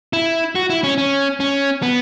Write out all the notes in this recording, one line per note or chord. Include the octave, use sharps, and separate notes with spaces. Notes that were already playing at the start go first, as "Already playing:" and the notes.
E4
F#4
E4
C#4
C#4
C#4
B3